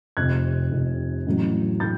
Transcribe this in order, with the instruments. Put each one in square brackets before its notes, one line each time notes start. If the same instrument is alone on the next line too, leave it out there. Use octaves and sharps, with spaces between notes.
[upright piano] F1 F2 C3 F#6 G#6
F1 F2 C3
A1 A2 F#3
A2 G6 A6